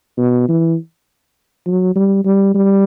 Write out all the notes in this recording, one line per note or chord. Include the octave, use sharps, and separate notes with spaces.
B2
E3
F#3
G3
G3
G3